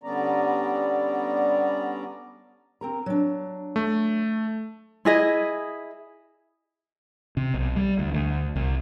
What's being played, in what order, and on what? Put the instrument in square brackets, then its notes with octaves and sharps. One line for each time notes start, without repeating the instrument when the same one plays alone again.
[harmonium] D3 G3 B3 C#4 D5 A#5
[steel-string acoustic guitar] C4 A#4 A#5
F#3 D4
[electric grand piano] A3
[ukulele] E4 G#4 D#5
[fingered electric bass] C3
B1
G3
D2
D2
C2